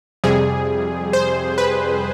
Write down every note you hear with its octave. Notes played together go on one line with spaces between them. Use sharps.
F2 C3 G3 G#4
C5
B4